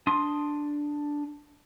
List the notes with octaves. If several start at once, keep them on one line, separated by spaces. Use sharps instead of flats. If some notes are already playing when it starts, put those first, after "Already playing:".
D4 C6 D#6